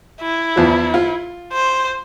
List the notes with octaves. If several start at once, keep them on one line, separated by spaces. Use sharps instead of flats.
E4
E2 F3
F4
C5